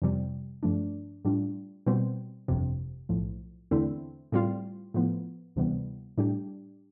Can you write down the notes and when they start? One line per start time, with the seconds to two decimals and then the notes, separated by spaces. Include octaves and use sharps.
0.02 F2 C3 G3
0.63 G2 F3 A3 D4
1.25 A2 G3 D4 F4
1.86 B2 G3 C4
2.48 G1 F2 C3
3.09 B1 A2 F3
3.71 E2 D3 A3 C4 E4
4.32 A2 G3 C4 F4
4.94 A2 F3 B3
5.56 D2 C3 E3 G3 B3
6.18 A2 G3 D4 G4